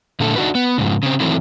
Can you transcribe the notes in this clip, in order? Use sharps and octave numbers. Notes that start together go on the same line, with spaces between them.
A#2 D3 A3 A4
D4 D#4 F#4 B4
B3
F2 G#2 C#3
C#3 C4
D#3 E3 F#3 A3 C4 E4